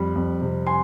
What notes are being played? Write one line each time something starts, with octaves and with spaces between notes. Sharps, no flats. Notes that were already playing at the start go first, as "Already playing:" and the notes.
Already playing: F2 G3 B5
F2
C3
G#5 C6